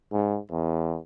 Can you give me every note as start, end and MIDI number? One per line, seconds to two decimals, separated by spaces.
0.12 0.38 44
0.51 0.98 40